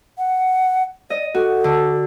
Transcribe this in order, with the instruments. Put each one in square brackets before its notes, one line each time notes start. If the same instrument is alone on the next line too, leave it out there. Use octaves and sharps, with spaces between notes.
[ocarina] F#5
[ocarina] D5 [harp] D#5
[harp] F#4 [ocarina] A4
[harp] D3